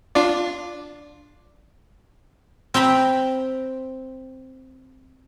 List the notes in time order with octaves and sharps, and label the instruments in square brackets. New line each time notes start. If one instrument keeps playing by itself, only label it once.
[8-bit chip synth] D4 F4 D5
[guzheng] C4 G5 A#5 B5